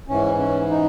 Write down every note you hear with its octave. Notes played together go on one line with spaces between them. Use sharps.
G#2 E3 C#4
C#4
D#4